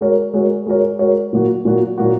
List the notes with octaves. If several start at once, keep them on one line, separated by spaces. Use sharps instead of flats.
G#3 F#4 A#4 C#5
G#3 F#4 A#4 C#5
G#3 F#4 A#4 C#5
G#3 F#4 A#4 C#5
A#2 F#3 A#3 F#4
A#2 F#3 A#3 F#4
A#2 F#3 A#3 F#4